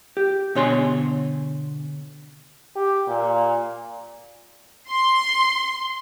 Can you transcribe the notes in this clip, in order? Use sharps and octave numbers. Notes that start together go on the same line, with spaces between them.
G4
B2 D3 C#5 G#5 C6
G4
A#2
C6